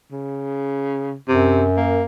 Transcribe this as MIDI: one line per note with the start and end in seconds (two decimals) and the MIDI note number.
0.12 1.16 49
1.29 2.06 42
1.29 1.65 48
1.77 2.05 58